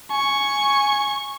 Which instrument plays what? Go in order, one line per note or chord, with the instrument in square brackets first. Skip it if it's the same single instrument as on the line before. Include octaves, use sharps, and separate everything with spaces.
[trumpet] G#5 [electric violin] C#6